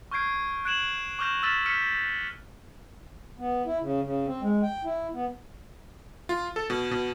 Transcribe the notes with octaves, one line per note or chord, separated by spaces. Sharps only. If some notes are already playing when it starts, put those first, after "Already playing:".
C#6 F6 G6 G#6 C7 D7
F#6 G#6 D7 E7 F#7
C#6 D6 F6 G6 A#6 E7
E6 F6 A6 B6 D#7 E7
F6 B6 C#7 D#7
B3
E4
C#3
C#3
C4
G#3
G5
E4
B3
F4
A4
B2
B2